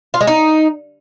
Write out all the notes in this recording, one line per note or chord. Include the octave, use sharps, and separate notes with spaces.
F4
G#3
D#4